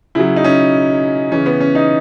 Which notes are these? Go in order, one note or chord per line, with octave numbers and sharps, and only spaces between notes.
C#3 F#3 E4
D#4
C#4
C#3 E3 C#4
B3
C#4
D#4